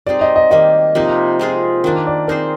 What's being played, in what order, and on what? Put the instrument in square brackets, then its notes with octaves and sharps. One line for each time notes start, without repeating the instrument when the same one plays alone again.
[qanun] G3 C4 D#4 G#4 [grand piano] D5
[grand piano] D#5
D#5
[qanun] D#3 G3 A#3 [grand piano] D#5
[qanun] C3 F3 A#3 D#4
G#3 C4 F4 G#4
D#3 A#3 D4
[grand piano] D5
[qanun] C4 D#4 G#4 C5 [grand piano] A#4